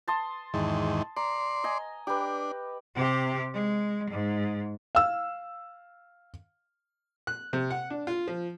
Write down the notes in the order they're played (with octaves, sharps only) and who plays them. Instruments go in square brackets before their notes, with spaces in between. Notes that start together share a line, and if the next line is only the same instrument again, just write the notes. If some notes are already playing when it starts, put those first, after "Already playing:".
[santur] A5 C6 D#6
[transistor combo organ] E2 G#2 D#3
[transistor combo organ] D5 C6 [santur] A#5
[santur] D#5 G#5
[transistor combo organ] D4 [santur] G4 B4
[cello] C3 G4
G#3
G#2
[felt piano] F5 E6
[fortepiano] F#6
C3
F#5
D4
F4
F3